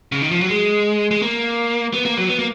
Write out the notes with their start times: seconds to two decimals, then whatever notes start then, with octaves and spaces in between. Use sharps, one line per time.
0.12 C#3
0.22 D#3
0.31 F3
0.41 F#3
0.50 G#3
1.11 G#3
1.22 A#3
1.94 B3
2.05 A#3
2.17 F#3
2.29 B3
2.39 A#3